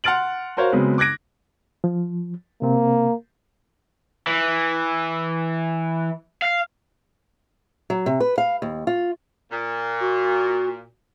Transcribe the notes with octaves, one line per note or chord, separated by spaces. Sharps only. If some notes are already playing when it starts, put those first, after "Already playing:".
F#5 C6 F6 A6 D7 F#7
F#4 A#4 C5 C#5 F5
C#3 F#3 G#3 B3 C4
D6 F#6 G#6 A#6 D7
F3
C3 A#3 C4
E3
F5
F#3
C3
B4
F5
D#2
F4
A#2
F#4